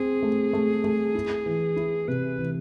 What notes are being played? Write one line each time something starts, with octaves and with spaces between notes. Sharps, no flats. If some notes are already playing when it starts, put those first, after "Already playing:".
Already playing: C4 G#4
A3
A3
A3
E4
E3
E4
C3 B4
E3